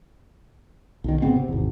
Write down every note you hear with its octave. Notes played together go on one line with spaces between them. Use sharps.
B1 D#3
G#1 C#3 B3 C4
C3
G#1 E2